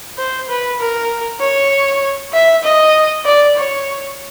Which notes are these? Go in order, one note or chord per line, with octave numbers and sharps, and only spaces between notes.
C5
B4
A#4
C#5
E5
D#5
D5
C#5